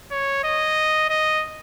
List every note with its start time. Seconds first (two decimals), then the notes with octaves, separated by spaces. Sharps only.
0.11 C#5
0.44 D#5
1.10 D#5